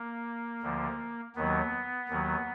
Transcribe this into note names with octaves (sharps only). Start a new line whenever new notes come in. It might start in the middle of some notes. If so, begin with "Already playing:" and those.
Already playing: A#3
D2 D3 F3
D#2 D#3 F#3 B3
D#2 D#3 F#3